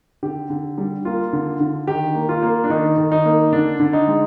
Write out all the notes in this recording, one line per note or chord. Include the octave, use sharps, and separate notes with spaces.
D3 G4
D3
G3
A#3 F4
D3
D3
D#3 G4
A#3
F4
A#3
D4
D#3 D#4
D#3
D#4
A#3
D3 D4
D3
D#4
G#3